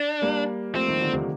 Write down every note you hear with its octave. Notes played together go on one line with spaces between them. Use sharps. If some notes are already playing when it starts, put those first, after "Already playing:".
Already playing: D4
G3 A#3
F3 A3 C4
D#3 G3
D3 F3
C3 D#3